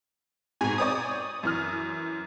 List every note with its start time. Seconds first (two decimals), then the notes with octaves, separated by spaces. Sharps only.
0.61 G#2 B2 G#5
0.78 C4 C#5 D5 D#6
1.43 F#2 E3 F6